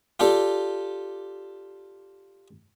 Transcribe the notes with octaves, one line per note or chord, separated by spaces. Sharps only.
F4 G4 A4 D5